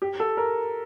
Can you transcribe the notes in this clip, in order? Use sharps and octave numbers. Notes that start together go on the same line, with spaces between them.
G4
A4
A#4